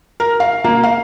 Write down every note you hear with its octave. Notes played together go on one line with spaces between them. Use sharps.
A#4
F5
A#3
F5